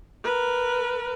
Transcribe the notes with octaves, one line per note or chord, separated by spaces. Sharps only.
A#4 B4